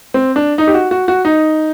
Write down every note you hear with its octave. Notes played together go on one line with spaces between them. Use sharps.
C4
D4
D#4
G4
F#4
F#4
F#4
D#4